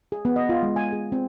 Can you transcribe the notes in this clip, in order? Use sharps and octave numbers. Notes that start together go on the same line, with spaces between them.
G#4
B3
D#5
F4
G#3
G#5
G#4
C4